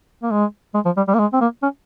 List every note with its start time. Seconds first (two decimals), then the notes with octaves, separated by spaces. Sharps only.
0.23 A#3
0.31 G#3
0.74 G#3
0.85 F3
0.97 G3
1.08 G3
1.14 A#3
1.19 G#3
1.33 C4
1.41 A#3
1.63 C#4